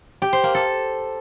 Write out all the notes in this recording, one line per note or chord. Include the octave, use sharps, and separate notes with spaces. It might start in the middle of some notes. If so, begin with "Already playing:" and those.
G4
C5
A#3
A4